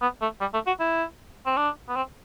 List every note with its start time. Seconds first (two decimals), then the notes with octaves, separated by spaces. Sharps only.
0.02 B3
0.22 A3
0.41 G3
0.54 A3
0.67 F#4
0.80 E4
1.46 C4
1.57 D4
1.89 B3
1.96 C4